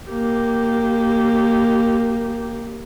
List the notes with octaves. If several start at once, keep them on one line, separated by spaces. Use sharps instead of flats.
A#3 G4